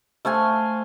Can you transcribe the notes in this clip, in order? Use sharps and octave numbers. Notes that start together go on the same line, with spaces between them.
A3 C5 F5 G#5